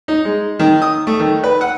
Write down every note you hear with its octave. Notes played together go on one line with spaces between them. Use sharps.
D#4
G#3
D#3
D#6
A3
D#3
B4
F#5